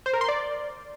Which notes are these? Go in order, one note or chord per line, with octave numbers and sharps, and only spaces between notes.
C5
A#4
C6
D5